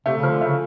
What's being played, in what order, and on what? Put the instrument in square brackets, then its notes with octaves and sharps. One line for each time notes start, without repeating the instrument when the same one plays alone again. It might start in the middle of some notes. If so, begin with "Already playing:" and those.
[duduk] C3 [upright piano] A3
[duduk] C#3
[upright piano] F3
[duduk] D3
[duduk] C#3 [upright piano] A3